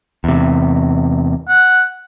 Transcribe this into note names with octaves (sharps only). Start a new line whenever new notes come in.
E2 C3
F#5